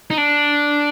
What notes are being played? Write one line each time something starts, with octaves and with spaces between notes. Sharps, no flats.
D#4
D4